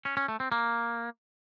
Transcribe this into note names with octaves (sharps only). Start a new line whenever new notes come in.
C#4
C#4
A3
C4
A#3